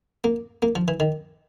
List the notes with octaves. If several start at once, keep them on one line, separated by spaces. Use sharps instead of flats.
A#3
A#3
F3
E3
D#3